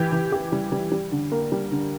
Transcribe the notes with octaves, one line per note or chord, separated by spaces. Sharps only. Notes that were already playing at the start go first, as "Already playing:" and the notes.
Already playing: E3 G4
E3
G4
G3
G3
G3
D3
A#3
G3
D3